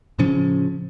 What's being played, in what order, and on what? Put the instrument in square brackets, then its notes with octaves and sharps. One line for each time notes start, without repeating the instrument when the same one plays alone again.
[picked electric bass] A2 C#3 F3 C#4